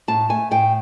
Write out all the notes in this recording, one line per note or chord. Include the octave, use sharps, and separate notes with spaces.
A2 A5
A3 G#5
A2 G5